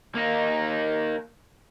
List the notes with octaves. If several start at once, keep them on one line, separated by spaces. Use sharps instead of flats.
A#3 D#4